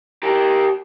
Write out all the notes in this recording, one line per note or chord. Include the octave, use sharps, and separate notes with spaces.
G4 A#4